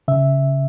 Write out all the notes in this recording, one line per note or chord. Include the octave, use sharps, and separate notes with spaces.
C#3 E5